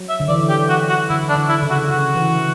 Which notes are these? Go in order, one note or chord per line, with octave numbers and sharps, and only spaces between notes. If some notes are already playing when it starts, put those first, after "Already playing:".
Already playing: F#3
E5
D3
E3 D5
G4
F#4
F#4
D3 E4
D4
D3
E4
C#3
F#4
C#3 F#4
E3